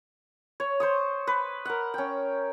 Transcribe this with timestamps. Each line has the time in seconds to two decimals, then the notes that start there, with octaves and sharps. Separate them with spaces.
0.60 C#5
0.80 C5 C#6 D#6
1.27 B4
1.65 A#4 F#5
1.94 C#4 G5